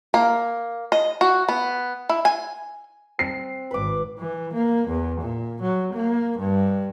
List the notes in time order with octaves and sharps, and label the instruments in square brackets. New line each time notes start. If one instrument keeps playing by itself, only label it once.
[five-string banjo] A#3
D#5
F#4
B3
E4
G#5
[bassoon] C4 [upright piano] C7
[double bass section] G#1 [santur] B4 D6
[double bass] E3
A#3
E2
A#2
F#3
A#3
G2